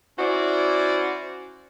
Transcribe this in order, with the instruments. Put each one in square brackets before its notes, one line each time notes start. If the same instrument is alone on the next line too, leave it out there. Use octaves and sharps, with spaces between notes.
[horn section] C#4 E4 F#4 C5 D5